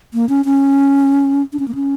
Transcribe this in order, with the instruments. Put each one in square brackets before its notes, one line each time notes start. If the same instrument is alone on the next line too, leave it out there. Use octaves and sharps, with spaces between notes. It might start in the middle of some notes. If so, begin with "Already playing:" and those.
[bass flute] A#3
C#4
C#4
D4
C#4
A#3
C#4